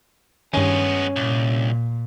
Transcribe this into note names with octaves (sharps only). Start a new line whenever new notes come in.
G2 D#3 G#3 B3 C#4
C2 A#2